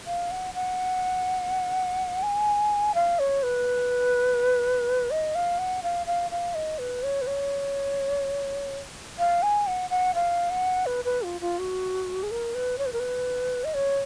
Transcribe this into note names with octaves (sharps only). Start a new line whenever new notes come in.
F5
F#5
F#5
G#5
F5
C#5
B4
D#5
F5
F#5
F5
F5
F5
D#5
B4
C#5
B4
C#5
F5
G#5
F#5
F#5
F5
F#5
B4
B4
F4
F4
F#4
G#4
A#4
B4
C#5
B4
A#4
B4
D#5
C#5